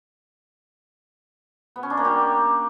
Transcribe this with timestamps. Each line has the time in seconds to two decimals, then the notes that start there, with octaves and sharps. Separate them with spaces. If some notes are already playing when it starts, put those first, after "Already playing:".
1.76 B3
1.83 C#4
1.90 D4
1.97 A#3
2.05 G4